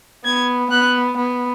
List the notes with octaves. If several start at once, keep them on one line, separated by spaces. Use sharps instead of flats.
B3 G#6
B3 F#6
B3